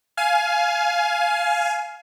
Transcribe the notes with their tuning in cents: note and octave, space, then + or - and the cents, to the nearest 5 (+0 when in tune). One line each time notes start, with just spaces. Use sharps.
F5 +0 G#5 +25